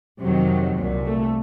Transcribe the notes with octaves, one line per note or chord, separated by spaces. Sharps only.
F2 C3 D#3 F#3
C2 A#2
A3